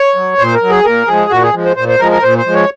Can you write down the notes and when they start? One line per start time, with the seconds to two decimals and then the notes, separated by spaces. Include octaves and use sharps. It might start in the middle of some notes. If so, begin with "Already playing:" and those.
Already playing: C#5
0.16 F#3
0.39 A#2 C5
0.55 A#4
0.62 F#3
0.70 G#4
0.85 A#2 A#4
1.08 F3 G#3 G#4
1.31 A#2 F#4
1.43 G#4
1.54 F3 G#3
1.65 C5
1.77 A#2 C5
1.88 C5
2.00 F3 G#3 A#4
2.12 A#4
2.23 A#2 C5
2.38 C5
2.46 F3 G#3
2.54 C#5